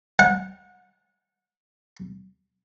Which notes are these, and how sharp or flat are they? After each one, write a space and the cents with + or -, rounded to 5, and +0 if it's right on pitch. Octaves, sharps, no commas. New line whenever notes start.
F#5 -30